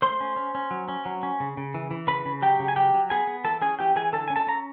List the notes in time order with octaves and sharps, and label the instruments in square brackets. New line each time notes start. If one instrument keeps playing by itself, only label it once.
[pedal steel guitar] A3 C5 C6
C#4
C#4
C#4
F#3
C#4
F#3
C#4
C#3
C#3
E3
E3
C#3 B4 B5
C#3
F#3 G4 G5
C#3
G#5
F#3 G4 G5
F#3
B3 G#4 G#5
B3
E3 A4 A5
C#4 G#4 G#5
E3 G4 G5
E3 G#4 G#5
D3 A4 A5
C#4 G#5
A4 A5
C#4 A#5